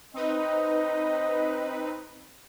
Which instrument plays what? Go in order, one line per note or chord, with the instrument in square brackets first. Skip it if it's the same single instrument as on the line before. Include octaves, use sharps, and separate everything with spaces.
[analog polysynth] C4 D#4 B4 [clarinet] D#5